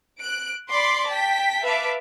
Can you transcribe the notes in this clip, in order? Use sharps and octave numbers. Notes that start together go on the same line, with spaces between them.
F#6 D7
D5 B5 C6 D6
G5 A5 B6
B4 E5 F5 A5 D6